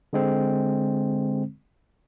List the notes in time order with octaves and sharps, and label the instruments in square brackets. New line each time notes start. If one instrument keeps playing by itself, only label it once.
[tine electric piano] D3 G#3 C4